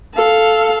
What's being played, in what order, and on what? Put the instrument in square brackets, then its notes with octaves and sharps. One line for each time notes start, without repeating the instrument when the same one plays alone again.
[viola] A4 F5